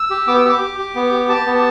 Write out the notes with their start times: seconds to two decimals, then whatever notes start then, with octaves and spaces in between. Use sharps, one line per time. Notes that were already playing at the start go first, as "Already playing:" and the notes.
Already playing: E6
0.10 G4
0.27 B3 D6
0.38 E6
0.45 G4 D6
0.61 G4
0.78 G4
0.95 B3
1.13 G4
1.29 G4 A5
1.46 B3
1.55 A5